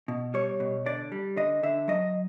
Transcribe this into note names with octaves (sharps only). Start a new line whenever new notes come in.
B2
G3 C#5
B2
D3 D5
G3
D3 D#5
D3 E5
F#3 D#5